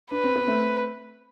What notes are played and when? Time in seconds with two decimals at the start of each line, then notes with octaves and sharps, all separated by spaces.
0.11 D4 B4
0.24 C4
0.36 B3
0.47 A3 C4